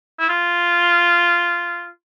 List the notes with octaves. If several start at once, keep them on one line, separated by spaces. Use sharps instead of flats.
E4
F4